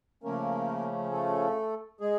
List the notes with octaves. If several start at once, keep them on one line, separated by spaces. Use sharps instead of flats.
C#3 F3 A3 A#3 C#4 A#4
A3 A4
G#3 G#4